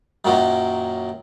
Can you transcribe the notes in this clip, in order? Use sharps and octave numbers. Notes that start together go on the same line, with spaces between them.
F#2 A#2 D#3 F#3 C#4